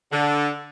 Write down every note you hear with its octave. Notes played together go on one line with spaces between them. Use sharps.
D3